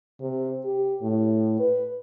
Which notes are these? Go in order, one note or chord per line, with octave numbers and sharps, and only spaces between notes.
C3
G4
A2
B4